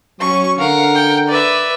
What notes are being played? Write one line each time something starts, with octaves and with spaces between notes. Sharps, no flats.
F#3 C#4 C#6
D3 A#4 F5 F#5
G5
B4 D5 E5